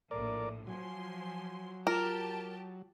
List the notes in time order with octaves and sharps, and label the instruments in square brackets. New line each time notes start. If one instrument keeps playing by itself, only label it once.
[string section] A#1 A2 [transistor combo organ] A#4 D5
[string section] F3 G#5 C6 [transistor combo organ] F#3
[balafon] F4 [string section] G4 A5 [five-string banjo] A#4